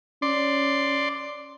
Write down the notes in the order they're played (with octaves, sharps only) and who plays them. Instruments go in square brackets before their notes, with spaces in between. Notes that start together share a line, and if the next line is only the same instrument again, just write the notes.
[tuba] C#4 [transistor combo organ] D5 C6